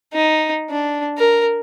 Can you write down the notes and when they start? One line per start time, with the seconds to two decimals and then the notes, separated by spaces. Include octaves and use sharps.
0.14 D#4
0.70 D4
1.18 A#4